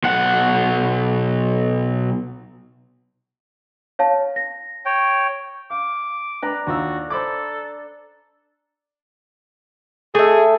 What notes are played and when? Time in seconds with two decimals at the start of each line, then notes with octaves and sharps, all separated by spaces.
0.04 B1 F#5
3.99 C#5 F5 A5
4.36 A#6
4.86 C#5 G5
5.70 F5 D6
6.42 D4 B4 A#5
6.67 D#2 D4 F4 F#4 E6
7.10 A4 C5 B5 D6
10.15 A3 G#4 E5